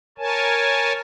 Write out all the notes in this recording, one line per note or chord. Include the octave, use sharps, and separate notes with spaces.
A#4 C#5 G#5 A5